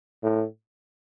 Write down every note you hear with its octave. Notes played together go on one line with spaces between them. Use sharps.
A2